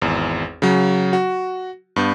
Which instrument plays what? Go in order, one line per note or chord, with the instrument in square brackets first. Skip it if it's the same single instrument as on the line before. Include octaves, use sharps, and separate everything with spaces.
[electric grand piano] G#1 E2
C#3 F#3
F#4
G2 B3 G6